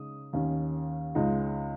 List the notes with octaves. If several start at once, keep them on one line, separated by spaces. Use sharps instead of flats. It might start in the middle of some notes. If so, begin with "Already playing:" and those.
Already playing: C#3 G#3 D#4 D#6
D#2 D#3 C#4
C#2 C#3 G#3 D#4